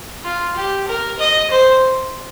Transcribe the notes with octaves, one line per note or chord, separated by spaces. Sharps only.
F4
G4
A#4
D#5
C5